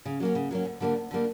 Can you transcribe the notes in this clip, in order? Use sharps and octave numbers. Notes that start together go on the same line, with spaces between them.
C#3
F#3 A#3 C#4
C#3
F#3 A#3 C#4
D2
D3 G3 A#3 D4
D2
D3 G3 A#3 D4